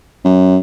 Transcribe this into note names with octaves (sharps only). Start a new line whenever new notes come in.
F#2